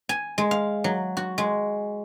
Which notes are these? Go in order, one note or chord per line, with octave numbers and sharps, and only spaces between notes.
G#5
G#3
F5
F#3
F#4
G#3